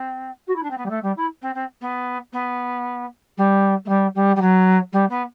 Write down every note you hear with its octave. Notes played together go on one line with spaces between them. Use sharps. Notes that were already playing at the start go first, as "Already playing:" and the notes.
Already playing: C4
F#4
E4
D4
C4
B3
G3
A3
G3
E4
C4
C4
B3
B3
G3
A3
G3
G3
G3
F#3
G3
B3